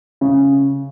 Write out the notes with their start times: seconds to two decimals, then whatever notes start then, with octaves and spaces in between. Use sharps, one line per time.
0.21 C#3